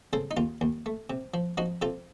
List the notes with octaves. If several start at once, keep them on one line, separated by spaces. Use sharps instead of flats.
C#3 A4 C5
D#4
D#2 F4
D#2
A3
C3
F3
F3 D#4 F#4
C3 F4 A4